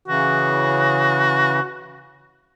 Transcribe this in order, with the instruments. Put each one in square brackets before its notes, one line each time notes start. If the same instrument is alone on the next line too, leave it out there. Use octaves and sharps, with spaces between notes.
[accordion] C#3 E3 [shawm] F#4